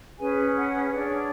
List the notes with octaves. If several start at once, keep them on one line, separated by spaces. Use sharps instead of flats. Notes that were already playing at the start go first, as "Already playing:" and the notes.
C#4 G#4 B4 G#5
F#5
D4 G#4 C#5